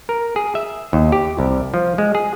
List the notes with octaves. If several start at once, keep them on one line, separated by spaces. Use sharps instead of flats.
A#4
G#4
E5
D#2
G4
C2
F3
G#3
G#4